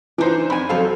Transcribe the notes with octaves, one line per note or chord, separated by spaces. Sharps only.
E3 D4 D#4 C5
F2 G#5 B5
F2 F#3 A4 C5 F5